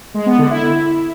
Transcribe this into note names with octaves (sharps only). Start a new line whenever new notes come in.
G#3
B3
D3
E4